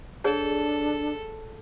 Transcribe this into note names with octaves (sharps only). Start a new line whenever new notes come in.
D4 G#4 A4 C#5 D5